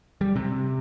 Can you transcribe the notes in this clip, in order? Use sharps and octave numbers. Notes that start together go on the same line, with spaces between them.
G3
C3